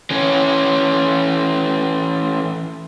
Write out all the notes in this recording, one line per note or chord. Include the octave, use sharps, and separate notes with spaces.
E3 C#4